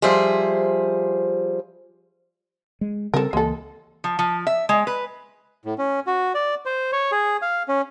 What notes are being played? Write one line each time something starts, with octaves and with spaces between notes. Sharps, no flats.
F3 G3 G#4 C5 E5
G#3
C#3 G3 C4 A4 A#4
C#2 E3 G#3 A#3 A4
F3
F3
E5
G#3
B4
A2
C#4
F#4
D5
C5
C#5
G#4
F5
C#4